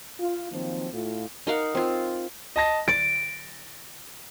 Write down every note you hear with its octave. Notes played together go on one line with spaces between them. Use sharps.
F4
D#3 F3 F#3 A#3 C4
A2 A3 E4 F4
D#4 A#4 F5 F#5
C4 F4
D#5 A5 A#6
A6 D7